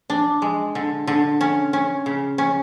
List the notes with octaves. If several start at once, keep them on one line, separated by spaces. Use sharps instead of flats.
D4
G#3
D3
D3
C#4
C#4
C#3
C#4